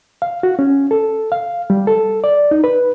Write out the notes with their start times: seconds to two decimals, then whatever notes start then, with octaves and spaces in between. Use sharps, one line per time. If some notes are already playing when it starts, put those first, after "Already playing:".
0.22 F5
0.43 F#4
0.59 C#4
0.91 A4
1.32 F5
1.70 G3
1.87 A4
2.24 D5
2.51 D#4
2.64 B4